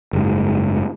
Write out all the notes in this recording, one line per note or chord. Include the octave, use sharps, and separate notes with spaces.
F#1 G#2